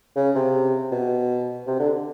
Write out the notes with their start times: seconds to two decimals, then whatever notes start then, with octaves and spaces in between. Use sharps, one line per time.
0.16 C#3
0.35 C3
0.92 B2
1.67 C3
1.79 D3